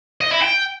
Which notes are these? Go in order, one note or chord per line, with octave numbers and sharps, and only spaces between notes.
D#5
E4
G5